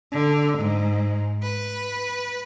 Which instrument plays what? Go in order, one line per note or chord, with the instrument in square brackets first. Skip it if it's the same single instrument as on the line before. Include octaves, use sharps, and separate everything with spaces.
[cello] D3
G#2
B4